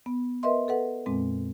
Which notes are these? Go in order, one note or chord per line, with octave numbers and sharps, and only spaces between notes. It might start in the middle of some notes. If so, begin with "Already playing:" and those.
B3
A#4 B4 D#5 E5 C6
A4 B4 F#5
F2 A#2 G#3 C4